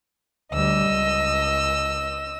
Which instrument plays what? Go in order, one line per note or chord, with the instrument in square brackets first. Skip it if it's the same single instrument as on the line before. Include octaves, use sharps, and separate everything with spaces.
[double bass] D2 G3 [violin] D#5 E6
[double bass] C#2